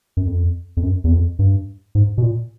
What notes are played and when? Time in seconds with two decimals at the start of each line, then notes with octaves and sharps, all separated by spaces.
0.17 F#2
0.27 F2
0.77 F2
0.83 F#2
1.04 E2
1.11 F2
1.39 G2
1.95 G#2
2.18 B2
2.22 A#2